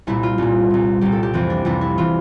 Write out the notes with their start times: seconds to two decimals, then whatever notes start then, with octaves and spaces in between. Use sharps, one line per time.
0.07 C2 A#2 E4
0.23 F4
0.38 C2 A#2
0.70 C2 A#2
1.01 C2 A#2 G4
1.12 A4
1.23 G4
1.34 F2 C3 E3 C4
1.50 D4
1.65 F2 C3 E3 E4
1.81 E4
1.98 C3 E3 F4